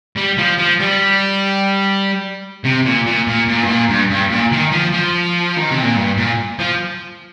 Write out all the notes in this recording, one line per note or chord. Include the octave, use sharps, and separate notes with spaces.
G3
F3
F3
G3
C3
A#2
A#2
A#2
A#2
G2
A#2
G2
G2
A#2
D#3
F3
F3
D#3
C3
A#2
G2
A#2
F3